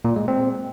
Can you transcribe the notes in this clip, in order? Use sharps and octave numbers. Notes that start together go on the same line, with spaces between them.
A#2
G#3
C4